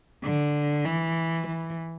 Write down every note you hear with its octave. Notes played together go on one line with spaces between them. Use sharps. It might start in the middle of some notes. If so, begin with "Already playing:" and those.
D3
E3
E3